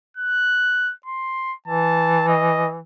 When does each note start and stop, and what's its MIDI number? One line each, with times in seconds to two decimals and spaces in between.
0.17 0.93 90
1.06 1.54 84
1.68 2.80 52
1.68 2.24 81
2.28 2.69 75